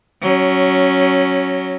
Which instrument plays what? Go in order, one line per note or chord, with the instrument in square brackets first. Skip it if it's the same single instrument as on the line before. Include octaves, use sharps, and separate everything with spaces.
[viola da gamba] F#3 C#4